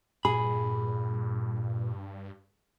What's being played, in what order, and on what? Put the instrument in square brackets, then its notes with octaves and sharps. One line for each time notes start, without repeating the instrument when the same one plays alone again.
[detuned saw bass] G2 [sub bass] A#2 [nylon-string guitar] G#4 [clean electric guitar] B5